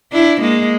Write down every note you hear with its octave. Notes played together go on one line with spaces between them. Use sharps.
D4 E4
G#3 A#3